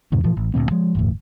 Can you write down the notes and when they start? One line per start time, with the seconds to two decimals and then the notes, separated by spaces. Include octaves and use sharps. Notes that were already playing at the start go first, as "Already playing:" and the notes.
0.12 E2 G#2 C3 D#3
0.24 A#2 E3 F3
0.37 A1
0.54 D2 A#2 G3 C4
0.71 F3 G#3
0.95 G1 E2 A2